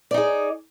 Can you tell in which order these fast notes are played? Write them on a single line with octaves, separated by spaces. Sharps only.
D5 D#4 G#4